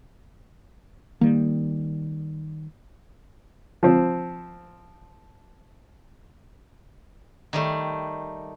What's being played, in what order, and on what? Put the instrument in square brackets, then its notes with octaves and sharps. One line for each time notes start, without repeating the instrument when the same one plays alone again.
[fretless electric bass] D#3 G3 [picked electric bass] A#3
[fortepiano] F3 C4
[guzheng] D#3 G3 A3